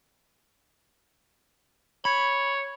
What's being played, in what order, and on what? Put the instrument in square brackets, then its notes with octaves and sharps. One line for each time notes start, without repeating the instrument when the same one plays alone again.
[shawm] C#5 [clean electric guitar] B5